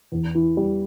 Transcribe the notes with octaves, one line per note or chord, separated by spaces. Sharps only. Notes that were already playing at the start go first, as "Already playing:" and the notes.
E2
E3
G3